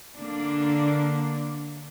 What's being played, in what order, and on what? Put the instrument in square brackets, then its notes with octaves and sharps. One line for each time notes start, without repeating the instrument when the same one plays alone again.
[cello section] D3 A#3 D4